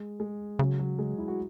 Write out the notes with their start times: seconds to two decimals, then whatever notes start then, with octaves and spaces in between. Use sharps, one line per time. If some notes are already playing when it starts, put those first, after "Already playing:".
Already playing: G#3
0.20 G#3
0.59 C#3 F#3
0.79 F#3
0.99 G#3
1.19 E4
1.28 F#4